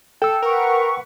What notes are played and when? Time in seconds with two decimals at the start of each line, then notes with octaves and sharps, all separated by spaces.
0.22 A4 G5 E6
0.42 A#4 B4 F#5 C#6